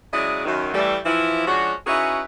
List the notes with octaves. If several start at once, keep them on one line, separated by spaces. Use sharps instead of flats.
C#3 F#3 G#3 E4 D5 D#5
F#2 D#3
E3 G3 A3
E3 F3 E4
F3 G#3 C#4 D4 F#4
C#4 D#4 E4 F#4 G#4 B4